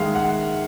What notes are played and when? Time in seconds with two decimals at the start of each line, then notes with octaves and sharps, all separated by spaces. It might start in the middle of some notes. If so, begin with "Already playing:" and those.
Already playing: D#3 G#3 E5 F5
0.15 F#5